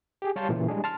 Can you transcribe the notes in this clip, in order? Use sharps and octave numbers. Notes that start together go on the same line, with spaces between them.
G4 G#4
G3 C#5 F5 A5 C6 G6
A#2 C#3 E3
G3 G#3 D4 G#4
A5 C6 F6